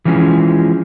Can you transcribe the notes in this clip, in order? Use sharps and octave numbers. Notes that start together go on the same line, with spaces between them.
E3 F3 G#3 C#4